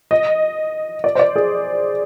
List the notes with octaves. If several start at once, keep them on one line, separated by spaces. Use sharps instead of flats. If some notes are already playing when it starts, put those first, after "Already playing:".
D#5
D5
C5
D5
G#4